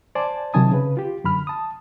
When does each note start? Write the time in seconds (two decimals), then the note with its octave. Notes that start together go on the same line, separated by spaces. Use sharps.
0.15 C5 D5 G#5 A5
0.54 C3 D#3 F#3 G#5 A5 D#6
0.72 C#3 B4
0.97 F4 G4
1.24 F#2 D3 B5 F6
1.47 A5 D#6